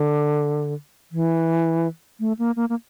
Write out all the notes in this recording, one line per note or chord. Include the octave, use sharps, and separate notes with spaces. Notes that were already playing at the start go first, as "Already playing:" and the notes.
Already playing: D3
E3
A3
A#3
A#3
A#3